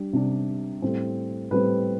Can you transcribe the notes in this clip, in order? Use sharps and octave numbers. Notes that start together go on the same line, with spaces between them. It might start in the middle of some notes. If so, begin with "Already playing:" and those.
Already playing: G3 D4
C3 G3 D4
A2 G3 C4
A2 G3 C4 B4